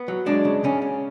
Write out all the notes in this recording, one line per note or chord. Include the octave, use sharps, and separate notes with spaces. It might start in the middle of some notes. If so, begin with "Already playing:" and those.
Already playing: B3
F#3
G#3 D4
C#3
C#3 C#4
C#4